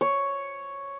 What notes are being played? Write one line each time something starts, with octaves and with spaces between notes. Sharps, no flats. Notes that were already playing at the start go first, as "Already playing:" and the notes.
C#5